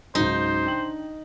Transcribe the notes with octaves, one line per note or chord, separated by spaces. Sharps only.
C#2 G#2 F#3 D#4 C5
D4 G5 F#7